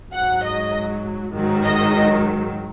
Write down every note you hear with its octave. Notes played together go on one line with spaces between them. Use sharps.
G#2 F#3 F#5
D#5
G#2 D#3 F#3
D#5